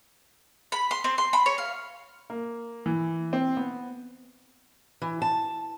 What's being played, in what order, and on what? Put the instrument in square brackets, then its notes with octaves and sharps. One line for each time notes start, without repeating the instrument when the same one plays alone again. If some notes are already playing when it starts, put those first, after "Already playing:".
[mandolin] B5
C6
C4
C6
B5
C#5
F5
[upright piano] A#3
E3
C4
B3
[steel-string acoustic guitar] E3
A5